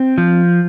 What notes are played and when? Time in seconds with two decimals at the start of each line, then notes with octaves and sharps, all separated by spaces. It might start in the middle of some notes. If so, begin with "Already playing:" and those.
Already playing: C4
0.18 F3